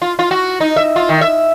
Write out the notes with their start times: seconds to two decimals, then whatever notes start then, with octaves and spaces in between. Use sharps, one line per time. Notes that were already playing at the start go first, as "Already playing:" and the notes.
0.02 F4
0.19 F4
0.31 F#4
0.60 D#4
0.76 E5
0.96 F4
1.09 D#3
1.21 E5